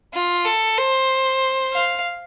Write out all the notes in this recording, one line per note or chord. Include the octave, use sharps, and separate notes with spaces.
F4
A4
C5
F5